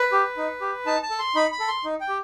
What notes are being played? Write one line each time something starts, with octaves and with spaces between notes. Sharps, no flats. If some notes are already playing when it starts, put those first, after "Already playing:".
Already playing: B4
G4
D#4
G4
D#4 A5
A5
A4
C6
D#4 B5
B5
A4
C6
D#4
G5
G4